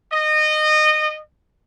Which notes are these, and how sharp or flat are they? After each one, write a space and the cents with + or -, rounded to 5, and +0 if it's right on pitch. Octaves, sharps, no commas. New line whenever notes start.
D#5 -25